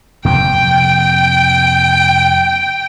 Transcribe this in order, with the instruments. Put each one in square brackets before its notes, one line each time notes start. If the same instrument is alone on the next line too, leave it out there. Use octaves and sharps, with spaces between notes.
[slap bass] F2 C3 A#3 [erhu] G5